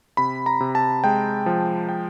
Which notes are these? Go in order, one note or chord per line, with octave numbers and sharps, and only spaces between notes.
C3 B5
A#5
C3
A5
G#3 G5
F3
G5